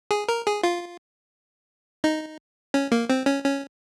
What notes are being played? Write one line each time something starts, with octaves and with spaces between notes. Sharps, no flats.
G#4
A#4
G#4
F4
D#4
C#4
A#3
C4
C#4
C#4